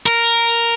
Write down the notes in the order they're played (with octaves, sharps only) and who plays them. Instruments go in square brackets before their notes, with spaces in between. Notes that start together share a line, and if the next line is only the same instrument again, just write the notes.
[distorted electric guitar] A#4